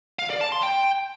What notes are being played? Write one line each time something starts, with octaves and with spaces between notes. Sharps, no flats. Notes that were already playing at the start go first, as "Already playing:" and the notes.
F5
D5
A5
C6
G5